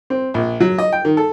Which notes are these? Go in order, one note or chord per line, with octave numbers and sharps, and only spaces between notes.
C4
A#1
F#3
D#5
G5
D#3
A4